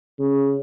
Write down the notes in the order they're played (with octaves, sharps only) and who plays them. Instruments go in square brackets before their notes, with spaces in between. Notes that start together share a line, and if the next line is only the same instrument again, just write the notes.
[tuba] C#3